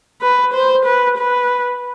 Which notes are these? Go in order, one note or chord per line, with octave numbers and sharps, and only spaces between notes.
B4
C5
B4
B4